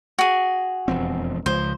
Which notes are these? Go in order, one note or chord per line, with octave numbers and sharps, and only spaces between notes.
F#4 G#4
E1 F2 C4
C#2 F3 C5